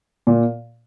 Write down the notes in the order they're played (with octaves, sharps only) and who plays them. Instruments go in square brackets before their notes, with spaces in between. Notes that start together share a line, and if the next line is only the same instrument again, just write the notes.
[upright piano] A#2